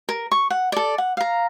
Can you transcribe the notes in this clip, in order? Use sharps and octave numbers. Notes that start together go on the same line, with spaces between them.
A#4
C#6
F#5
A4 D5
F#5
F5 A#5